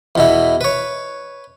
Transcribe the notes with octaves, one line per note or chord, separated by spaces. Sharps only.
E2 B2 E4
B4 C#5